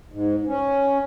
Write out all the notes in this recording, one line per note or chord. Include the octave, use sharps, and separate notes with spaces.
G#2
C#4